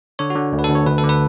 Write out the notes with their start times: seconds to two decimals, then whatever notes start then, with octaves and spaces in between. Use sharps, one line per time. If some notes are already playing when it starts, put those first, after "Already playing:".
0.19 D3 C#5
0.30 F#4
0.36 D3
0.53 D2
0.59 B4
0.64 D2 A4
0.75 C#5
0.86 D2 B4
0.98 A4
1.04 D3
1.09 B4